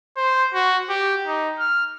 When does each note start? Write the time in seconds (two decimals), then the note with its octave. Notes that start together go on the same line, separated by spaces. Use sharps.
0.17 C5
0.54 F#4
0.89 G4
1.27 D#4
1.59 F6